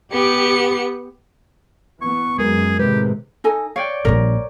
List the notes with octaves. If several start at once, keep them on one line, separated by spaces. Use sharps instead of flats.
B3 G4 C#7
E3 B3 C#6
F#2 G#3 G#4 A#4
A2 C3 D#3 G#3 G4 B4
D#4 A4 G#5 A#6
C#5 D5 F5 G5
A#1 G3 A#4